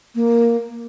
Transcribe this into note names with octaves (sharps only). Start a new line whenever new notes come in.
A#3